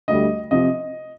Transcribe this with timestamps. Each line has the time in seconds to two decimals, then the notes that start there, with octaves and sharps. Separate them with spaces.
0.08 D2 D3 G3 D#5
0.51 C3 F3 D#5